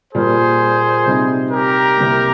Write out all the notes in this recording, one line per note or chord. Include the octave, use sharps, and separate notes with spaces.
A#2 G3 A#3 G#4 C5
C3 G3 C4 D#4
G4 A#4
C2 C3 G3 A#3